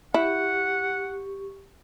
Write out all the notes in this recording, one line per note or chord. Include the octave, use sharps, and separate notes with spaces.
E4 G4 F#5 C#6